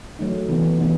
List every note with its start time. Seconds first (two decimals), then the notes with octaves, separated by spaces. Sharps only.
0.19 F#3 A3 D#4
0.49 C3 E3 B3 D#4
0.78 C3 E3 B3 D#4